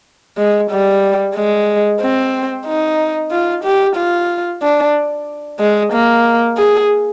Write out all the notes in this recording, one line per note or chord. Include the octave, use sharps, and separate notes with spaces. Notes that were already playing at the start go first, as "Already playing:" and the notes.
G#3
G3
G#3
C4
D#4
F4
G4
F4
D4
G#3
A#3
G#4